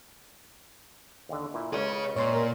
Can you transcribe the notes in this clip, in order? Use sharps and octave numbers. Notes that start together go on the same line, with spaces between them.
D#2 D3
A#2 E4
C#2 G#4 C#5
A#2 C#5 C6
A#4